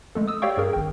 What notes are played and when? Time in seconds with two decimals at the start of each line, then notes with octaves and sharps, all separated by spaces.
0.15 G#3 A3 A4
0.27 D#6 E6
0.42 G4 C#5 D5 F5 G5 C#6
0.57 G2 G#4 A#4
0.73 G#1 G5